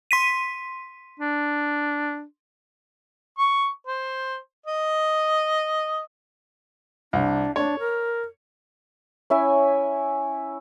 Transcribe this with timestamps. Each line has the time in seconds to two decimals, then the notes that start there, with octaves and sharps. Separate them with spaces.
0.11 C6 B6 D#7
1.19 D4
3.38 C#6
3.87 C5
4.66 D#5
7.13 C2 D4
7.56 D4 C#5
7.79 A#4
9.30 C#4 E4 E5 G#5